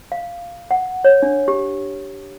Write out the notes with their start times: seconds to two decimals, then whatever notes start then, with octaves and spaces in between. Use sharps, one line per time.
0.12 F5
0.71 F#5
1.04 C#5
1.23 D4
1.48 G4